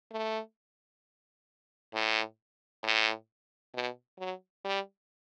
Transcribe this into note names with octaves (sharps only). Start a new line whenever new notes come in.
A3
A2
A2
B2
F#3
G3